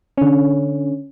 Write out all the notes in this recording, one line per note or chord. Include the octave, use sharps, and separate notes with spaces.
D3 C#4